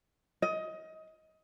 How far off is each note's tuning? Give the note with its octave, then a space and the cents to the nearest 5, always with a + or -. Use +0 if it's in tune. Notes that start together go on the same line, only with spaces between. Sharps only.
D#5 +20